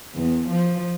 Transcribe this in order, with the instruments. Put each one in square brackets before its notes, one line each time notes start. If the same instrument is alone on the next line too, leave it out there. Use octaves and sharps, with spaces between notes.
[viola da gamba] E2
F3